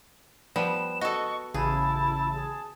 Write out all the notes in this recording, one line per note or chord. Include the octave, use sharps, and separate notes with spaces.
F3 G3 B3 E7
F#4 A4 D#5 C#6
A1 C#3 E4 G#4 A5
G#4